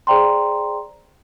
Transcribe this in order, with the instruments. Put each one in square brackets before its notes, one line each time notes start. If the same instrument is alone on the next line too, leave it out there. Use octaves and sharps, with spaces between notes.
[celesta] G#4 C5 D5 G5 A#5 C6